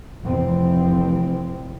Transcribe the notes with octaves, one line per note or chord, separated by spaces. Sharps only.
F1 F2 E3 F3 C4